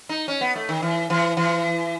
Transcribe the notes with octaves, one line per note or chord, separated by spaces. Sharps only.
D#4
C#4
B3
A3
D#3
E3
E3
E3